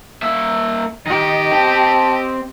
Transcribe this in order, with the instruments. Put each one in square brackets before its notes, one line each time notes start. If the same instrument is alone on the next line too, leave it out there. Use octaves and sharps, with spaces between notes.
[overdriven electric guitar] A#3 E5
[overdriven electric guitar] D#3 [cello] G4 D#5
[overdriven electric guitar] C4 G5 [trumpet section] A5